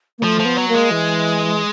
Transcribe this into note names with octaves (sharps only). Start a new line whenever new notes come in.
A#3
F3 A3
F3
B3
F#3
A#3
G#3
E3